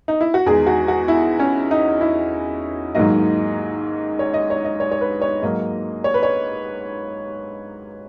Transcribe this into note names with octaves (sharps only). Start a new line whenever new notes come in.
D#4
E4
F#4
E2 D#3 G#3 G#4
F#4
F#4
E4
C#4
D#4
E4
G#2 D#3 F#3 A#3 D#5
C#5
D#5
C#5
D#5
C#5
C#5
B4
C#5
G#2 F#3 A#3 D#5
C#5
B4
C#5